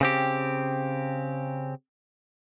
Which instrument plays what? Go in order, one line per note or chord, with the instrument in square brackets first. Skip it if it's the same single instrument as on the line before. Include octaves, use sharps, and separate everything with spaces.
[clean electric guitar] C#3 C4 G4